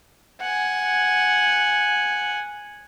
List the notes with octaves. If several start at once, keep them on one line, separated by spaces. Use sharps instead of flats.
F#5 G#5